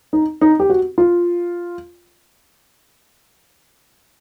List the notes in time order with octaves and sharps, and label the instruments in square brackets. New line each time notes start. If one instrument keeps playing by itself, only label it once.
[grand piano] D#4
D#4
G4
F#4
F4